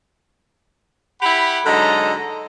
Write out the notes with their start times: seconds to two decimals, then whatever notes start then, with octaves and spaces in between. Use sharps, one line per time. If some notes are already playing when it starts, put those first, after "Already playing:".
1.22 E4 G4 F#5 B5
1.66 G#2 D3 F#3 A4 D#5 A#5